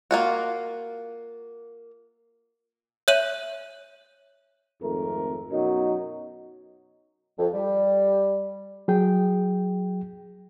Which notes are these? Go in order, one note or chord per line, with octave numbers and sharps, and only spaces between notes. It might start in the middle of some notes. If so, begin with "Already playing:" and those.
A#3 F4 F#4
C#5 E5 F#6 D#7 F#7
G#1 F2 A3 A#4
F#2 B2 F#3 D#4
F2
G3
F#3 G#4 G5